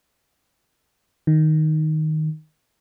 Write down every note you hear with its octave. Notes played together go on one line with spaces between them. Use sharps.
D#3